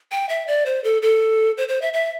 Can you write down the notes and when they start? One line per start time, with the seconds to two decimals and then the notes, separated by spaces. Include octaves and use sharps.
0.12 G5
0.29 E5
0.47 D5
0.66 C5
0.84 A4
1.02 A4
1.57 C5
1.68 C5
1.82 E5
1.93 E5